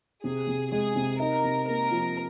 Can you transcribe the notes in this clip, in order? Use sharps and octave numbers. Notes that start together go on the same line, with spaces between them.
C3 G#4
C3
G#3 G#4
C3
D#4 A#4
C3
A#3 A#4
F3